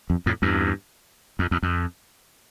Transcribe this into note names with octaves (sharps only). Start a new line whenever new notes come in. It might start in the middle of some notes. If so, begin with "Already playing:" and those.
F2
F2 A2
E2 G2
F2
E2
F2